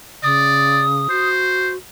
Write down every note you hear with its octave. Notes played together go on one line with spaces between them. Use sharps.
C#3 D5 D#6
F#4 C5